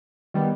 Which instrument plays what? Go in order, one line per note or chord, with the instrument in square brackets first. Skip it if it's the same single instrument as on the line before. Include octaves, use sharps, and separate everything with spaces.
[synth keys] D#3 G3 B3